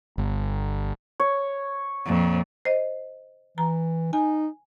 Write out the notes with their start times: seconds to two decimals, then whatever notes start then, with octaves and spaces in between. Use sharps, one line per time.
0.18 G1
1.20 C#5
2.06 F2 A#2
2.65 C5 D#5
3.58 E3 A#5
4.13 D#4 G#5